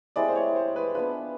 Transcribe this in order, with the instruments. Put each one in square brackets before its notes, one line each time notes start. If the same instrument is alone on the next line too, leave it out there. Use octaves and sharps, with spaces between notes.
[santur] G#3 C4 E4 G4 [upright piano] D5
[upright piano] C5
C#5
C5
B4
[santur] B3 D4 F4 [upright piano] B4